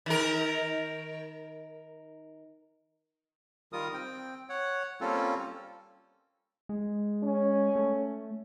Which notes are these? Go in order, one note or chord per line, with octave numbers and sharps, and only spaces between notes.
D#3 A#4
D#3 G3 F4 A#4 D#6
C4 G5
C#5 F#5
G3 A#3 C4 C#4 F4 A4
G#3
C#4
A3